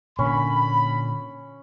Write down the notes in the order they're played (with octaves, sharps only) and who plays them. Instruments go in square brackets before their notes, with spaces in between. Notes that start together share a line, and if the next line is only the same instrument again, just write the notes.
[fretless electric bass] A#2 D3 A#3 [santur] C#4 [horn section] B5